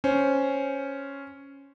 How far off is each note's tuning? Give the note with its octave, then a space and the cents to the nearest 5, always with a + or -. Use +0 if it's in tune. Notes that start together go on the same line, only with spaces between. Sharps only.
C#4 +0 C5 +0